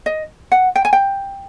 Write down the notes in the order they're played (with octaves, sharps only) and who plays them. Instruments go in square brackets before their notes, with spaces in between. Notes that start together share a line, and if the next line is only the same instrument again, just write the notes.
[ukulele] D#5
F#5
G5
G#5
G5